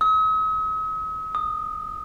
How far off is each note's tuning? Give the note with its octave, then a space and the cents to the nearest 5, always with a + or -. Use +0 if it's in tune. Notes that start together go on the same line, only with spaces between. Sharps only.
D#6 +45
D#6 -15